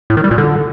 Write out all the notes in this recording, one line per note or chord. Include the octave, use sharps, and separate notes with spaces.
A2
D#3
G3
A#2
D3